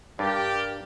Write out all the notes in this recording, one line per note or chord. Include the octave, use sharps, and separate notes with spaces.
G2 G4 A#4 D5